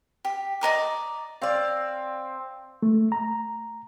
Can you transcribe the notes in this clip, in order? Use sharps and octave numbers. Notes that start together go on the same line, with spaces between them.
G4
D5 D#5 A#5 D6
C4 D5 F5
A3
A#5